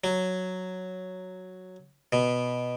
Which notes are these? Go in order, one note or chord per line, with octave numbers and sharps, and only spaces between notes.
F#3
B2